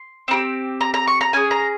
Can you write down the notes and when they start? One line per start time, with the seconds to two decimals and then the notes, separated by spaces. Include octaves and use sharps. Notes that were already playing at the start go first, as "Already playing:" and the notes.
Already playing: C6
0.28 C4 D#4 G4
0.81 A#5
0.94 A#5
1.07 C#6
1.21 A#5
1.33 C#4 G#4 G#5
1.51 A#5